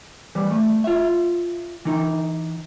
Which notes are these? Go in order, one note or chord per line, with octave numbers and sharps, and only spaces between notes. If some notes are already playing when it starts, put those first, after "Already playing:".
E3 G3
A3
F4 E5
E3 D#4